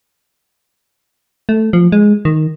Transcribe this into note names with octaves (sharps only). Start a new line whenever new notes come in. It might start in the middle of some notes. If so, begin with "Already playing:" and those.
A3
F3
G#3
D#3